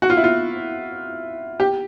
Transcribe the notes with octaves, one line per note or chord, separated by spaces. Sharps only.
F#4
F4
E4
F4
G4